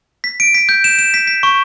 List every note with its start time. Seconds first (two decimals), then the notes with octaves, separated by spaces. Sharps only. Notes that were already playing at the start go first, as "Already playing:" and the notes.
0.24 B6
0.40 D7
0.55 B6
0.69 G6
0.84 E7
0.99 E7
1.14 B6
1.27 B6
1.43 C#6